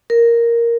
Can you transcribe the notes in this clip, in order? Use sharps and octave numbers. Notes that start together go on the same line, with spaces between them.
A#4